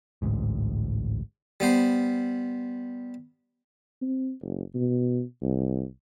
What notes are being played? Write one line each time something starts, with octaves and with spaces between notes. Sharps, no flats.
A1 D2 G#2
G3 B3 C5
C4
F#1
B2
C2